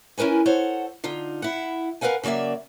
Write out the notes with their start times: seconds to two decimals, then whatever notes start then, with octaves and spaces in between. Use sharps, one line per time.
0.18 C#4 E4 A#4 B4 G#5
0.46 A4 C5 C#5 F#5
1.04 D3 D#4 F4
1.42 E4 F#5
2.01 A#4 B4 D#5 F5 F#5 G#5
2.23 C#3 F#3 A#3 D5 E5